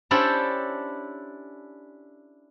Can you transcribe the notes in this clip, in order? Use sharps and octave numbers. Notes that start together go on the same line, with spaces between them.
C#4 D4 E4 G4 A4 C5